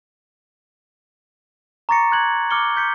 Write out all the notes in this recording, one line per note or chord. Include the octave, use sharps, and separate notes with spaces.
A#5 C#6 D6 A6 A#6 C#7
C6 F#6 G#6 F#7
D6 F6 C#7 G7
G6 B6 C#7